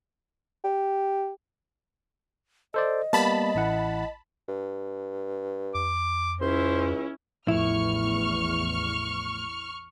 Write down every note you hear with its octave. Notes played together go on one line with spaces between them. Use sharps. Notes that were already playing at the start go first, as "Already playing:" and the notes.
G4
A4 C5 D5 D#5
G3 A#3 B3 A5 B5
A1 E4 F#5
G2
F2 D6
C#2 C#4 E4 C5
A1 E2 A2 F3 A3 E4 C#6 F6